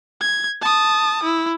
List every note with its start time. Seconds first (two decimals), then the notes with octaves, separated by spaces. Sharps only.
0.21 G#6
0.61 A5 D#6
1.23 E4